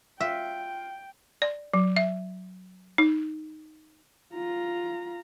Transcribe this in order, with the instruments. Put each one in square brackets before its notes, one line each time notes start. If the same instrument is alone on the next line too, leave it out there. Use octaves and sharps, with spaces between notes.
[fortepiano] F4 [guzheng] E5 [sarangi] G5
[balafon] D5
F#3
E5
D#4
[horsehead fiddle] F4 A#5